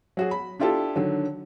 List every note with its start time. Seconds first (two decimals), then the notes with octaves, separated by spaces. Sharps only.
0.17 F#3 F#4 G#4
0.31 B5
0.59 D4 E4 F4 G4 A4
0.96 D3 D#3 F#3